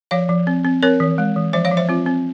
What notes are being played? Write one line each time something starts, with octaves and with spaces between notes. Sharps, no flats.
F3 C#5 F5
F3
C4
C4
C4 A#4 C#5
E3
G#3
E3
F3 C5 E5
C#5 F5
F3
C5 E5
C4 F4
C4